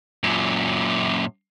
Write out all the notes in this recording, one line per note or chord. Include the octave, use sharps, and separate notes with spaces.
F#2 A#2